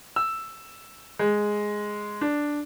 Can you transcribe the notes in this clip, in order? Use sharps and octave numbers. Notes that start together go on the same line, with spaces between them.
E6
G#3
D4